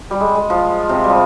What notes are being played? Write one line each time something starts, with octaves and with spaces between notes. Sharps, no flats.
G3
G#3
G#3
F3
C3
G3
F3